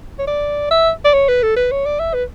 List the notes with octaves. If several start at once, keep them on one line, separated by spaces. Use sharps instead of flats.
C#5
D5
E5
D5
C#5
B4
A4
B4
C#5
D5
E5
B4